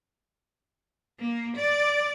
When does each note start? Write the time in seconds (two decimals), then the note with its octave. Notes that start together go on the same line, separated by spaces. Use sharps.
1.19 A#3
1.57 D5